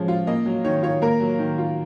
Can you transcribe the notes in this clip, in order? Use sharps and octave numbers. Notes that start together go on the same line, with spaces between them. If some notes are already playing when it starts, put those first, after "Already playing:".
Already playing: F3 G#3 C#4
F4
A#3 D#5
F#3
D#3 C#5
F4 C#5
A#3 A#4
F#3
D#3
F4